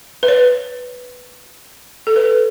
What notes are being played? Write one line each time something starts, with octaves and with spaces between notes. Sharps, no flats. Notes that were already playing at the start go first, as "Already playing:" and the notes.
B4
C#5
A4
B4